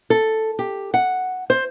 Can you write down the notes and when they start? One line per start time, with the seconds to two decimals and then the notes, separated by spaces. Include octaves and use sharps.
0.10 A4
0.59 G4
0.94 F#5
1.50 C5